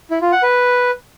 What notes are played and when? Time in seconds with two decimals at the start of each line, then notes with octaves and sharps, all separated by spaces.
0.11 E4
0.21 F4
0.32 F#5
0.43 B4